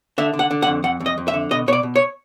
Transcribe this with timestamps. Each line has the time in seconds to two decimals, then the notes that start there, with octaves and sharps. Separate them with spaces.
0.18 D3 E5
0.34 D3
0.39 F#5
0.51 D3
0.62 F#5
0.67 F2
0.84 F2 F#5
1.00 F2
1.06 D#5
1.18 F2
1.28 E5
1.34 D3
1.51 B2 D#5
1.68 B2 C#5
1.73 D5
1.83 B2
1.96 C#5